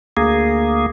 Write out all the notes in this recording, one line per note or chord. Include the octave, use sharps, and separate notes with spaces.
D2 A#3 G#4